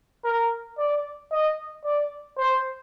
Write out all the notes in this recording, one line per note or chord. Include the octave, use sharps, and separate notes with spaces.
A#4
D5
D#5
D5
C5